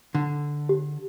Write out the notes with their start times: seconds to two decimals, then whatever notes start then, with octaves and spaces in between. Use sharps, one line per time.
0.15 D3
0.69 G4